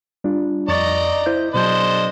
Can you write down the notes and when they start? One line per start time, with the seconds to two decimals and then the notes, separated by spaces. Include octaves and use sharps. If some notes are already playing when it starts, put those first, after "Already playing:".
0.24 G3 D4 F4
0.68 F2 D5 D#5 A#5 C#6 A6
1.26 E4 C5 G6
1.54 B2 F#3 D4 C5 D#5 G6